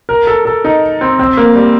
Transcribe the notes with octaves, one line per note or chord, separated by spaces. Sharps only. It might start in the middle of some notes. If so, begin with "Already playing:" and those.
A#4
A4
A4
D#4
C4
C4
A#3
G3